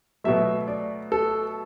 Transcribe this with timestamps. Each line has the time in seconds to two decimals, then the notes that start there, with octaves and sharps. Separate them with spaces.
0.24 B2 F#3 A3 E5
0.68 D5
1.12 A4